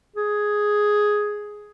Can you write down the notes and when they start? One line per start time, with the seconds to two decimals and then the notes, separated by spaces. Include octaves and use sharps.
0.16 G#4